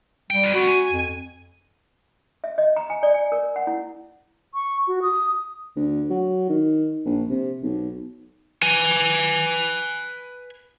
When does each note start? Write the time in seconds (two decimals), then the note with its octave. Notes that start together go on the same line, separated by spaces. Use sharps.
0.30 G3 G5
0.43 F4 B4
0.55 C4 F#4 B5
0.68 G#5
0.92 F2
2.44 E5
2.58 D#5
2.76 A#5
2.90 G#5
3.03 D5
3.14 G#5
3.32 A#4
3.56 F#5
3.67 E4
4.54 C#6
4.87 F#4
5.02 D#6
5.77 D2
6.10 F#3
6.50 D#3
7.05 A#1
7.30 C3
7.63 B1
8.62 B4 G#5